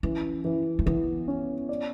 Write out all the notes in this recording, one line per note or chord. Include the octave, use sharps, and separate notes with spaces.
E3 C#4
E3
A3
E3 B3
C#4
D5